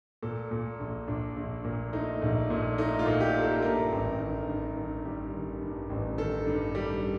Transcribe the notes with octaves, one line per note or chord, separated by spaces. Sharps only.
A#2 A4
A#2
A#1
A#1 D4
A#1
A#2
A3 D#4
A#1
A#2
A3 D#4
F4
A#2
G4
A3
A4
G2 A#4
A1
D#3
G2
D#3
G3
D#3
G2
A1
D#3 A4
G2
G3